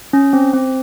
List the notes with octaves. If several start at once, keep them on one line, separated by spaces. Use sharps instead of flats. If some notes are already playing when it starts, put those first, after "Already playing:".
C#4
C4
C4